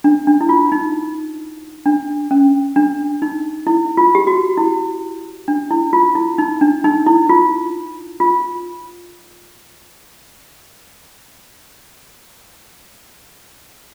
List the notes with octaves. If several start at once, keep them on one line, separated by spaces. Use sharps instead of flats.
D4
D4
E4
F4
D#4
D4
C#4
D4
D#4
E4
F4
G4
F#4
E4
D4
E4
F4
E4
D#4
D4
D#4
E4
F4
F4